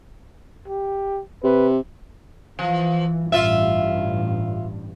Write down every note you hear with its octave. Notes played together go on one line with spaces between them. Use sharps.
G4
C3 B4
E3 F3
A1 G2 F4 E5